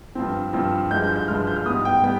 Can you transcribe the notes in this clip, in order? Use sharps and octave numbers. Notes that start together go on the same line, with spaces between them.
G2 F3 C4
G2 F3 C4
G2 F3 G#3 G6
G6
G6
G2 F3 G#3 F6
G6
F6
G#2 G3 B3 D#6
G5
G3 B3 G5